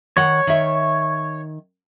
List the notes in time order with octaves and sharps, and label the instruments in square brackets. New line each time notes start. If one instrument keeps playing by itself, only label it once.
[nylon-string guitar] D#3 F#5 [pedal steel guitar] C#5
[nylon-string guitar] D#3 E5